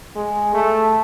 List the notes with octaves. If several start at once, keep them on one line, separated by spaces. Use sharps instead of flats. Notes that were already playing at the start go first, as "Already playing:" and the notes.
G#3
A3